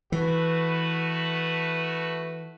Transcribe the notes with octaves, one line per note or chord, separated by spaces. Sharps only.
E3 A3 F#4 B4